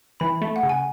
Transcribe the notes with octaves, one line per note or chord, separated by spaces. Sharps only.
E3 B5
A3
F#5
C#3
G#5